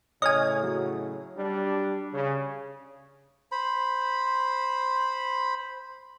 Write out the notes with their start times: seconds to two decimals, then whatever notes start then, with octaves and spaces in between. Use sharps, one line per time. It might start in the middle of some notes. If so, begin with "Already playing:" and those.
0.22 A2 C#3 C#5 D#5 G#5 F6
0.63 F#3
1.37 G3 D4
2.13 C#3
3.52 C5 B5